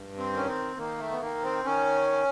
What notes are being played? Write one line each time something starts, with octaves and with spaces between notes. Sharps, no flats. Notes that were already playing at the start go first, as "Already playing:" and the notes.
Already playing: G2
C4
D#3 C#4
C4
D#3 A#3
A3
B3
D#3 A#3
C4
D#3 C#4